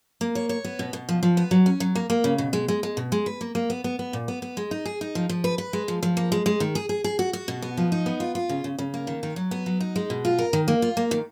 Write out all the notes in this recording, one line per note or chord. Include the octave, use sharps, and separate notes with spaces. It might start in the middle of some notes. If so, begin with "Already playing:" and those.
A#3
C#5
C#5
B3
B2
B2
F3
F3
B3
F#3
C#4
F#3
A#3
A#3
C#3
B2
G#3
G#3
G#3
B2
G#3
B4
A#3
A#3
B3
B3
B3
A#2
B3
B3
G#3
D#4
G#4
D#4
F3
F3
B4
B4
G#3
F3
F3
A#3
G#3
G#3
D#3
G#4
G#4
G#4
F#4
F#4
B2
B3
F3
D#4
B3
F4
F4
C#3
C#3
C#3
A#3
D#3
D#3
F#3
B3
F#3
D#4
G#3
B2
F4
A#4
D#3
A#3
F4
A#3
D#3